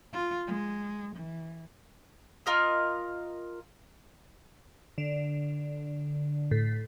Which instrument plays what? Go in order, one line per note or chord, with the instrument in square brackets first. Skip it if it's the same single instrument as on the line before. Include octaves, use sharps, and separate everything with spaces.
[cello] F4
G#3
E3
[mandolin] F4 A#4 D#5
[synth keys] D3
A2